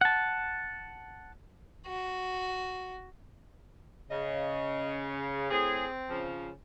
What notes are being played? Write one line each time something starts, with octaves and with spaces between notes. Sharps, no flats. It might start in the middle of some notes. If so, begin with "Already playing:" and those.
F#5 A5
F#4
C#3 D#5
A2 C4 G#4
C#3 F3